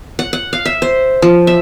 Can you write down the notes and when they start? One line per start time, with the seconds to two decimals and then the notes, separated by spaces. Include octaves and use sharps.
0.19 F#5
0.33 F#5
0.53 F5
0.65 E5
0.82 C5
1.22 F3
1.47 E5